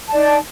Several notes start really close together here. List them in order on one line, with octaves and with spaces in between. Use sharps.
A5 D5 D#4